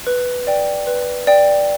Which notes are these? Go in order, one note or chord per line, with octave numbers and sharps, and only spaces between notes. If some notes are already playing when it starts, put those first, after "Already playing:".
B4
D5 G5
B4
D5 G5